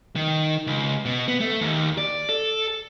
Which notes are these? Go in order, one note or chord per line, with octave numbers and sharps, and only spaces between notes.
D#3
C#2
B2
B3
A3
D#2
D5
A4